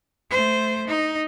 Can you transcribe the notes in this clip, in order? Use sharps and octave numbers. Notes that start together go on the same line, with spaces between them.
A3 C5
D#4